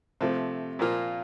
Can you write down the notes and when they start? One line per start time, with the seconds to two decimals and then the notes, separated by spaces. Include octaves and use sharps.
0.21 C3 F3 A3
0.79 A#2 F3 A#3 F4